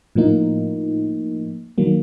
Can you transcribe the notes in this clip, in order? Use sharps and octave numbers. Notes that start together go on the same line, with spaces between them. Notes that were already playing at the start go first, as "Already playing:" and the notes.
A2 F3 A#3 D#4
D#3 F#3 A#3